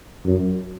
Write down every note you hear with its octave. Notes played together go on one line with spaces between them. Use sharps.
F#2